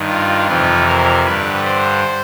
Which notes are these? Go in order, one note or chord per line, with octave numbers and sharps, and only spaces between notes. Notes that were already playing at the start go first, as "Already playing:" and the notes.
Already playing: G2 D#3
F4
F2 C3 E3 F4
A#4
G2 D3 B4
C5